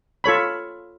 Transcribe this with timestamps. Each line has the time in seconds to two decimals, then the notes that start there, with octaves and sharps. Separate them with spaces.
0.24 F4 A4 C#5 B5